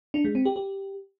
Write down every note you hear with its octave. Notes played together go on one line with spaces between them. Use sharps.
D4
G#3
C4
G4
G4